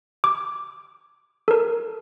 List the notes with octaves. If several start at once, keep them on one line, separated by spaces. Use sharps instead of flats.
D6
A4 A#4